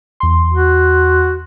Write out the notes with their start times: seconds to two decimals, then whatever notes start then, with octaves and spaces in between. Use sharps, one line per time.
0.20 E2 C6
0.53 F#4